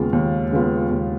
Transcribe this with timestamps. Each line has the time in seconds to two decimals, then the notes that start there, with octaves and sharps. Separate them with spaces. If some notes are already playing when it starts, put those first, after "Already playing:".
Already playing: D#2 C#3 G#3 B3 F4
0.13 D#2
0.52 C#3 G#3 B3 F4
0.91 D#2